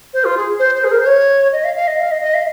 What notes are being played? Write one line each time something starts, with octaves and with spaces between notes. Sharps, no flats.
C5
F4
G#4
C5
C5
G#4
A#4
C5
C#5
D#5
F5
F5
D#5
F5
D#5
D#5
F5